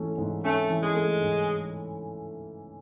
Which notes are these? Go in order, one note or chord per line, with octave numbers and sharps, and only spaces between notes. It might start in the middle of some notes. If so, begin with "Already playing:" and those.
Already playing: G#2 E3 A3 C#4
G#2
A3 C#4
E3
G#3
A3
G#2